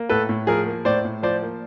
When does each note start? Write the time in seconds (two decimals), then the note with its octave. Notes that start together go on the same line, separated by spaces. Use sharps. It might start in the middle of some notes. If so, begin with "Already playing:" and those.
Already playing: A#3
0.09 A2 A4 B4
0.29 A2
0.47 F3 G#4 A#4
0.66 A#3
0.85 A2 C5 D5
1.05 A2
1.23 F3 C5 D5
1.42 A#3